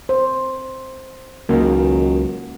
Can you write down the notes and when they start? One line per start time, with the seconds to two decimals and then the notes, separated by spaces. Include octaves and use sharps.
0.09 C5
1.49 C#2 F#2 D#3 A#3